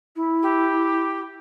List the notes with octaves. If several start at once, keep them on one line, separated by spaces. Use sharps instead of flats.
E4
G4